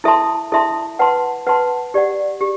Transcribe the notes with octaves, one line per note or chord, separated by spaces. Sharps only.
E4 A4 E5 A5 C6
E4 A4 E5 A5 C6
B4 F#5 A5 C6
B4 F#5 A5 C6
G4 D5 F#5
G4